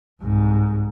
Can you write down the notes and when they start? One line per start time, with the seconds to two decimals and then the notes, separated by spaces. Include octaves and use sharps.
0.22 C2 G#2